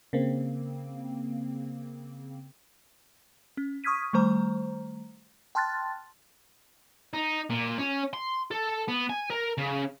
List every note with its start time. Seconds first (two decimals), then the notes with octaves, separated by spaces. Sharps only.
0.13 C#3 A#3 C4
3.57 C#4
3.84 C#6 D#6 F6 G#6 B6 D#7
4.13 D#3 G3 A3 C5 A#5
5.55 G5 A5 C6 F6 F#6 A6
7.13 D#4
7.50 A#2
7.78 C#4
8.13 C6
8.51 A4
8.88 B3
9.09 G#5
9.30 A#4
9.58 C#3